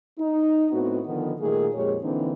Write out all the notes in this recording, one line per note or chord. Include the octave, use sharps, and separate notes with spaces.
D#4
A2 B3 C4 F#4
D3 D#3 F3 B3
A#2 D#3 G3 A3 A#3 G#4
F2 A#2 G#3 G4 G#4 C#5
D3 E3 A#3 C4 D4 D#4